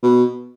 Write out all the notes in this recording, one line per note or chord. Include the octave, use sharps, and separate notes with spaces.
B2